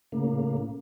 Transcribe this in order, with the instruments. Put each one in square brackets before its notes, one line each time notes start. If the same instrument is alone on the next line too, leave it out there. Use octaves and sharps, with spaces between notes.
[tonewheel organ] A2 C#3 A#3